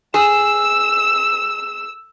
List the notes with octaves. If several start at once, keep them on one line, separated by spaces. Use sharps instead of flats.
G#4 E6 E7